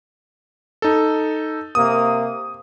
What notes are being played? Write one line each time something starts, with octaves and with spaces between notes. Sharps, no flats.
D#4 A4
C3 A#3 D#6